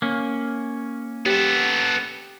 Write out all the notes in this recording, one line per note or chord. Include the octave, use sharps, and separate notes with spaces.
A#3 C#4
B3 G4 A4